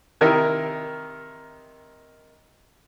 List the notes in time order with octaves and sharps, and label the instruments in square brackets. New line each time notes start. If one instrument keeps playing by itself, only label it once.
[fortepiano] C3 D#3 E4 A#4 D#5 E5